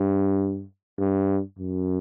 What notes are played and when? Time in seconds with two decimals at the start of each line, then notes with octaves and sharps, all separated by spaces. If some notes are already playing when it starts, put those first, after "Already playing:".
Already playing: G2
0.99 G2
1.59 F#2